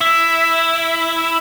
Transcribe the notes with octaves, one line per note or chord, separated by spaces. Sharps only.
E4